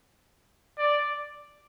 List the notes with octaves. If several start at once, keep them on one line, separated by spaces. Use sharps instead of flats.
D5